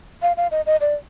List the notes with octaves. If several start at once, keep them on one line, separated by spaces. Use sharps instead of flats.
F5
F5
D#5
D#5
D5